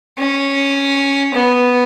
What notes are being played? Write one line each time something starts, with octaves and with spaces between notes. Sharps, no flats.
C#4
B3